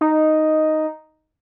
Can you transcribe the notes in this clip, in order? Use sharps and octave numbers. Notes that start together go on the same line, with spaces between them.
D#4